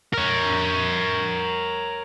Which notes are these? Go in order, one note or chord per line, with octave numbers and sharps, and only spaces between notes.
A#4 C#5